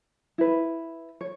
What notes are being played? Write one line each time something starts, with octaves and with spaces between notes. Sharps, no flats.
E4 B4
C#5